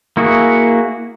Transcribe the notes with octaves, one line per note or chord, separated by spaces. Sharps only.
A#3 E4 F#4 G#4